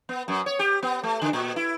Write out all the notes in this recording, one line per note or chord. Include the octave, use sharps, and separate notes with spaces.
B3
F#2
C#5
G4
B3
A3
D3
A#2
E4